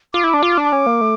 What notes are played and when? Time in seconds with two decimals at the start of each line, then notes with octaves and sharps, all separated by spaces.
0.14 F4 D6
0.24 E4
0.34 D4
0.43 F4
0.58 D4
0.72 C#4
0.86 A#3
1.01 A3